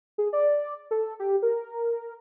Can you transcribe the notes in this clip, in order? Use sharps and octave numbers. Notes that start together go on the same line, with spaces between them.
G#4
D5
A4
G4
A#4